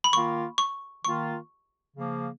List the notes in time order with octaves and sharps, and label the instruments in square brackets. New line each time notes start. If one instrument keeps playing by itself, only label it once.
[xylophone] B5
[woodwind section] D#3 A#3 F4 [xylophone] C#6
[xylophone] C#6
[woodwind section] D#3 A#3 F4 [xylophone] C#6
[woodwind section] C#3 F3 A#3